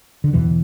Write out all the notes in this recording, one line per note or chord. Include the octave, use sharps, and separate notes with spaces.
D3
E2 B2 E3